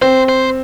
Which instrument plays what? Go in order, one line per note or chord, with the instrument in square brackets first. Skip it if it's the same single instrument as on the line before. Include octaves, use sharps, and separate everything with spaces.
[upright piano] C4 [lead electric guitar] C5
[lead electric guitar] C5